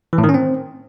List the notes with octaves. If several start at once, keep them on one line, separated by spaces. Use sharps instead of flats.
E3
A2
D#3
C#4
C4